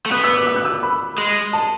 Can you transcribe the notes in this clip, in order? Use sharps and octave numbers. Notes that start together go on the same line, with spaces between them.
A3
B3 F#6
E6
D6
E6
F#6
E6
B5
G#3
A5